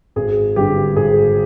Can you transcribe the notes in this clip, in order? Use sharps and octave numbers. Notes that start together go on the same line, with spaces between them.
G#1 G#4
G2 D3 G4
G#1 G#4